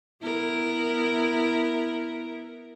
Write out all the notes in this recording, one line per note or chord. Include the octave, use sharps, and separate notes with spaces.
B3 E4 A#4